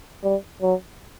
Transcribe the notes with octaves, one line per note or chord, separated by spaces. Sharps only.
G3
F#3